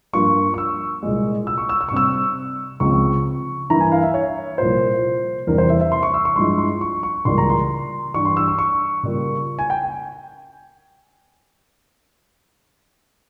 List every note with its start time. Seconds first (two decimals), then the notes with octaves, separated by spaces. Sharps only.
0.13 G2 F3 A#3 F4 C#6
0.54 C#6
0.58 E6
1.03 C2 A#2 G#3
1.47 E6
1.58 C#6
1.69 E6
1.81 E6
1.89 C#6
1.92 C3 G3 C4 E6
2.80 C#2 C#3 F3 C4 F4 C#6
3.70 G2 E3 A#3 E4 A#5
3.80 G#5
3.92 F5
4.03 E5
4.14 C#5
4.58 C2 A#2 F3 A#3 F4 C5
5.47 E2 C3 E3 G3 A#4
5.58 C5
5.70 E5
5.81 E5
5.92 C6
6.03 C#6
6.14 E6
6.25 C#6
6.36 G2 F3 G#3 E4 C6
6.58 C6
6.81 C#6
7.03 C#6
7.25 C#2 C#3 E3 G3 A#3 C6
7.38 A#5
7.49 C6
8.14 G2 E3 G3 C#6
8.25 C6
8.37 E6
8.48 C#6
8.59 C#6
9.03 C#3 G3 A#3 F4
9.59 G#5
9.70 G5